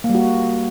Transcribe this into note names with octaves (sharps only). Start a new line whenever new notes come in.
A#3
G3
F#4